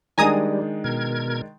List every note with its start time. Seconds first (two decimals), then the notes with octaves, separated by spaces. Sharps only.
0.18 D#3 G3 G#3 D4 G#5 A#5 D#6
0.84 B2 A#4 G#6